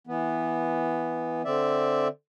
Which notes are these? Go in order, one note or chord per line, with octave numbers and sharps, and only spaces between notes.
E3 B3
D3 C4 D5 E5